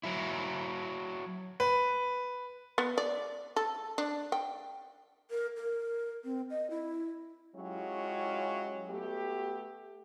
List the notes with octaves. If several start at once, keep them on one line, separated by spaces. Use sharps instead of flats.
F#3 E4
B4
B3
D5
A4
D4
G5
A#4
A#4
C4
D#5
E4
F#3 G#3 C#4 E4 F4 G4
A3 B3 F#4 G4